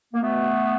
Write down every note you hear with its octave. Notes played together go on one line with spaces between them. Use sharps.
A#3
B2 A3 B3